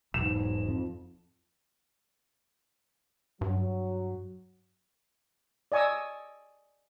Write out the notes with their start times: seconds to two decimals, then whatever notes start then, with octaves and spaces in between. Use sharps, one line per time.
0.14 E1 B1 G#2 E7
0.68 F2 F3
3.41 G2 F#3
5.72 D5 D#5 G#5 C#6 D#6 E6